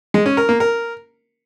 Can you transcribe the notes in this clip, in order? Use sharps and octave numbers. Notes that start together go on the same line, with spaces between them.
G#3
C#4
A#4
A#3
A#4